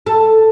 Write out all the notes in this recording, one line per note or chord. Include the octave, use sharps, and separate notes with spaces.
A4